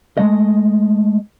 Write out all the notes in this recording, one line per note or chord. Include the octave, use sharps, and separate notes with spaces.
G#3 A3 D#5